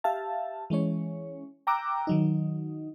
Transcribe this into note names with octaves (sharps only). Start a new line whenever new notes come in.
G4 E5 F5 A5
E3 G#3 C#4 C#5
G5 A#5 D6 E6 F#6
D#3 F#3 D#4